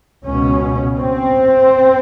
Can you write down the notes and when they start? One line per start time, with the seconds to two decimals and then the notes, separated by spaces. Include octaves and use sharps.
0.24 C#2 B2 C#4
0.98 C4